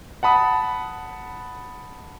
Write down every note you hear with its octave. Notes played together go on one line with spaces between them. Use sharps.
F#5 A5 B5 D#6